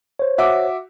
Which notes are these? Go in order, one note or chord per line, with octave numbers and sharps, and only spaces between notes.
C5 C#5
F#4 E5 D6